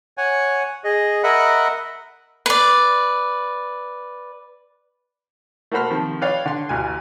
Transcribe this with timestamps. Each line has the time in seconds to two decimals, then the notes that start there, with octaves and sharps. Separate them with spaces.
0.18 C#5 F#5 G#5
0.84 G#4 D#5
1.24 A#4 D#5 E5 F#5 B5
2.46 B4 D5
5.72 A3 A#3 F#4 C5 B5 F6
5.90 C3 D#3 F3
6.21 B4 C#5 D5 F5 G5
6.46 D3 C6
6.69 A1 D2 G#5